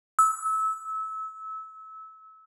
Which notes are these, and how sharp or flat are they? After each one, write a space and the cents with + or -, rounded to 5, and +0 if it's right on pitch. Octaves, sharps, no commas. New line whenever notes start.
E6 -25